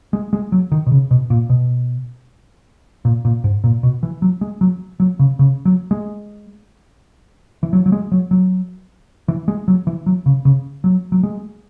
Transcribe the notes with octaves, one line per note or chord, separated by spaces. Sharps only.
G#3
G#3
F#3
D#3
B2
C#3
B2
A#2
B2
A#2
A#2
G#2
A#2
B2
E3
F#3
G#3
F#3
F#3
C#3
C#3
F#3
G#3
E3
F#3
F#3
G#3
F#3
F#3
E3
G#3
F#3
E3
F#3
C#3
C#3
F#3
F#3
G#3